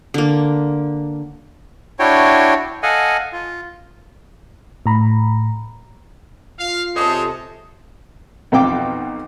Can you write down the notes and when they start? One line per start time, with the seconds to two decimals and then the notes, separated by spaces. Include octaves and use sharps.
0.14 D3 A#3
1.99 D4 E4 F#4 C#5 G5
2.83 A4 D#5 F5 F#5 G#5
3.33 F4
4.86 A2 A#5 B5
6.59 F4 F5
6.96 C3 G#3 A4 C5 C#5 D#5 D#6 E6
8.52 B1 F2 F5 G5 D6